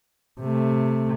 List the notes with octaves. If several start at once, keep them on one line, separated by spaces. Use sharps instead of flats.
C3 A3